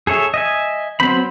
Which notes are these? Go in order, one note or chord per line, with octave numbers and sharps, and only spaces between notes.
G#4 A4 C#5 E5
D#5 E5 G#5
F#3 B3 C4 C5 B5